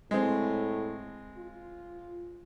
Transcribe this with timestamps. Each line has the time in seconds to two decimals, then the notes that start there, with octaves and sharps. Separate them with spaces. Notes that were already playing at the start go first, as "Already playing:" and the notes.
0.11 A2 G#3 C4
1.37 F4